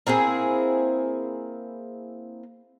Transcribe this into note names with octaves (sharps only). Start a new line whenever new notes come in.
A#3 C4 E4 G#4